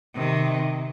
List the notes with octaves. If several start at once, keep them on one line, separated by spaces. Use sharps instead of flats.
C3 D#3